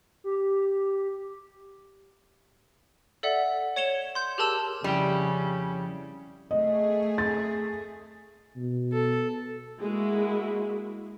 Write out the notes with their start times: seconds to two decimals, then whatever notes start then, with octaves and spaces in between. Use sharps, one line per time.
0.24 G4
3.23 A4 D5 E5 F#5
3.76 C#5 G#6 C#7 E7 F7 G7
4.15 C6 G6
4.38 G4 G#4 A#4 A5 E6 F7
4.84 F2 C#3 G3 E4 G5
6.51 A3 G#4 D#5
7.18 A6
8.56 B2
8.93 A4
9.80 G#3 A#3 E4 F#4